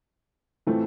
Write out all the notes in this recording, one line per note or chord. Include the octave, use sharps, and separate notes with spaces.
A2 E3 A3 C4 F4